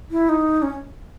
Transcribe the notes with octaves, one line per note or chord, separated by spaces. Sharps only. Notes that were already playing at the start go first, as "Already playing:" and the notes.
E4
D#4
C#4